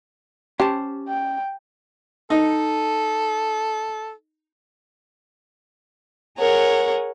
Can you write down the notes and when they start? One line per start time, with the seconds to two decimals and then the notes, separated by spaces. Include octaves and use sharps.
0.60 C#4 G4 C5 A5
1.08 G5
2.30 D#4 A4
6.38 G#4 A#4 C#5 F#5